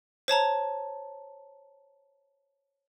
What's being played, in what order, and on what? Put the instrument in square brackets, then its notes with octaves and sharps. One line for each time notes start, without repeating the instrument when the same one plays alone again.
[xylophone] C5 C#5 A5 A#5